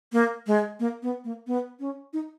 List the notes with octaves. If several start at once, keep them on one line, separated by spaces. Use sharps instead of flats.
A#3
G#3
A#3
B3
A#3
B3
C#4
D#4